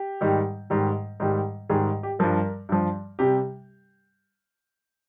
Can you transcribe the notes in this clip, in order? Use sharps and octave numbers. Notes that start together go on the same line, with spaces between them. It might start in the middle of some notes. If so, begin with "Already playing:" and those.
Already playing: G4
G#2 D#3 G3
G#2 D#3 G3
G#2 D#3 G3
G#2 D#3 G3 G#4
G4
G2 F3 A#4
G2 F3
C3 G3 G4